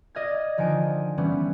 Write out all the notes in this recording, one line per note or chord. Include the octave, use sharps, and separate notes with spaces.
D5 D#5 F6 G#6
D3 D#3 F3 D#5 G#5 D7
E3 G3 B3 C#4